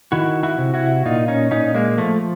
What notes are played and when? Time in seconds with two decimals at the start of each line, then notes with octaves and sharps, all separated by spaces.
0.12 D#3 E4 F#4
0.43 E4 F#4
0.58 C3
0.74 E4 F#4
1.06 A#2 D#4 F4
1.28 C#4 D#4
1.51 A#2 C#4 D#4
1.75 G#3 A#3
1.98 F3 A3